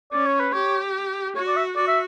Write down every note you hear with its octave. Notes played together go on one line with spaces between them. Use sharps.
C#4 D5
C#5
B4
G4 C#5
F#4 C#5
D5
E5
F#4 D5
E5